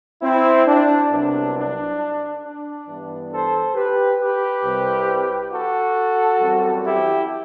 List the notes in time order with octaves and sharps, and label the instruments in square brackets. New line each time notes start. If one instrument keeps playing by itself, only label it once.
[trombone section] C4 E4
D4
C2 C3 F#3 B3 D4
D4
D4
G2 E3 B3
A4 C5
G4 B4
G4 B4
C2 C3 G3 C4
F#4 A4
F#2 E3 G3 C4
E4 G4